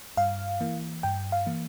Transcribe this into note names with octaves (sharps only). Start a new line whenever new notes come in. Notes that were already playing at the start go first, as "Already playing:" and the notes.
G2 F5
E3 A#3
G2 G5
F5
E3 A#3